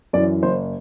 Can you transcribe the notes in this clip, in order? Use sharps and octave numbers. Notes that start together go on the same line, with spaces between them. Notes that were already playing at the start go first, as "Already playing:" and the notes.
F#2 E3 D5
F#1 C5